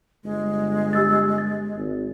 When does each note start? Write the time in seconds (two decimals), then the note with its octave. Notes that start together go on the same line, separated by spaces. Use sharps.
0.24 G1 G#3
0.93 G4 E6 A6
1.38 A6
1.75 G#1